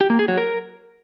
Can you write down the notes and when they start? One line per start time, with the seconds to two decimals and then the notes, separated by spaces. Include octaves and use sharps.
0.01 G4
0.10 A#3
0.19 G#4
0.28 F#3
0.37 A#4